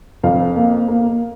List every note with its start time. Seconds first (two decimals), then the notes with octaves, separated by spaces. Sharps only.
0.23 F2 F5
0.56 A#3
0.88 A#3